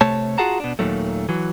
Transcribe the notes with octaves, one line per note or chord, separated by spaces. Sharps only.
C3 A3 C#5 A5
F4 F#4 G#4 F#5 A5 A#5
B2 D4
D#2 A#2 D#3 F#3 A3
E3 F#3